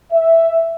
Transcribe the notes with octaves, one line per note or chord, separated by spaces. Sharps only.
E5